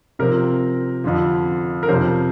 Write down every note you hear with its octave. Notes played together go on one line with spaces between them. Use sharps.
C3 F3 C4 A#4
F2 D3 F3
A#4
F2 C3 F3 C5